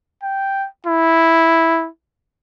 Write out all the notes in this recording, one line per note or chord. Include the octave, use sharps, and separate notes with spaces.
G5
E4